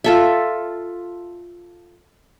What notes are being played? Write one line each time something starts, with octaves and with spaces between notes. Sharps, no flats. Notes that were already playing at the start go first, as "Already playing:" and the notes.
F4 A4 E5